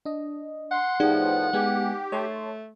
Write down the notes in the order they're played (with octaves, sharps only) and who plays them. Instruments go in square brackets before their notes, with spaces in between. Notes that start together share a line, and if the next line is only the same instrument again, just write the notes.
[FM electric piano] D4 D#5
[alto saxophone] F#5 [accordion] C6
[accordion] A2 F3 B3 [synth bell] D#4 G#4 D5 [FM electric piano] G4
[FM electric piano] G#3 B3 G#5 [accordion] G4
[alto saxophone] A3 [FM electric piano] C#5 A5 C6